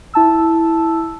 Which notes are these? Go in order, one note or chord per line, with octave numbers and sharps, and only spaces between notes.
E4 A5 E6